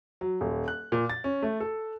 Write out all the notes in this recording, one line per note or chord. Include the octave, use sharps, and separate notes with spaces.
F#3
D#1
F#6
A#2
A6
C#4
A3
A4